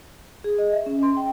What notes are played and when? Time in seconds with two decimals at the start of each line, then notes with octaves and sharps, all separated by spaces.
0.44 G#4
0.58 D#5
0.72 E5
0.86 C#4
1.03 C6
1.17 G5